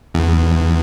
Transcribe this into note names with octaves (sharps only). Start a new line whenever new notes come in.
E2